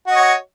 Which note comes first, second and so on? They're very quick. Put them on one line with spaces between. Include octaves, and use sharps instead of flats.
F#4 D#5 C#5